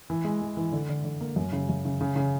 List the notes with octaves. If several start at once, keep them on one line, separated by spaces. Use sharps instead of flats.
E3
G#3
G#3
E3
D3
D3
D3
A#3
F#2
C#3
F#2
C#3
C#3
C#3